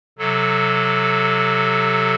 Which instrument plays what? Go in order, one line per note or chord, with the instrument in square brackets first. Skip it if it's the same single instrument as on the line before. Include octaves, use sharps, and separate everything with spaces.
[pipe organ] C3 F#3 A4